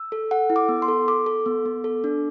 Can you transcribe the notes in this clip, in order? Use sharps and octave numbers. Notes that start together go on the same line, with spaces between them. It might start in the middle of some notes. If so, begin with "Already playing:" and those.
Already playing: E6
A4
A4 F#5
E4
D6
B3
C6
A4
A4 D6
A4
B3
B3
A4
D4